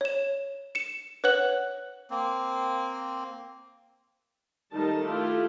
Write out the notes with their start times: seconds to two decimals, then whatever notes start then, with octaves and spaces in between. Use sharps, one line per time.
0.01 C#5 E7
0.75 C#7 E7
1.24 B4 C#5 F#5 F#6 F#7
2.10 A#3 C4
4.73 D#3 G3 A3 D#4 A5
5.05 A3 E4 F4 G4